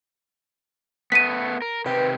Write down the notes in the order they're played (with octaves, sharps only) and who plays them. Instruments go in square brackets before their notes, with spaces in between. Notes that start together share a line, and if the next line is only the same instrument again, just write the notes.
[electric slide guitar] A3 B3 [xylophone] B6 D#7
[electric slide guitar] A#4
[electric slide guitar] C3 D#3 G4 [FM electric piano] B4